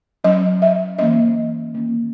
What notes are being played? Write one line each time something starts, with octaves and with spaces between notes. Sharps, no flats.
F#3 C#4 D#5
E5
E3 A#3 C#4 D#5
D#3 A#3 C#4